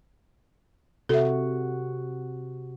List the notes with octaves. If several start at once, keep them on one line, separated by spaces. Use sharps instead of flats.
C3 F#4 A4 E5